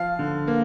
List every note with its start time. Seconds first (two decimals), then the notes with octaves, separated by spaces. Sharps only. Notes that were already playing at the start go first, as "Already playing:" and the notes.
Already playing: F3 F5
0.19 D3
0.47 A#3